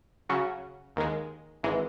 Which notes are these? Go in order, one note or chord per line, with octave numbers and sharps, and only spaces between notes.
C#3 F#3 C#4 F#4
D#2 D#3 G#3
G#1 E3 G#3